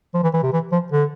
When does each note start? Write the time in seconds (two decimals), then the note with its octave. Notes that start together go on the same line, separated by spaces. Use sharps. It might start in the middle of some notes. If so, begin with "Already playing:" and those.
0.14 F3
0.23 E3
0.33 E3
0.43 C3
0.53 E3
0.72 F3
0.92 D3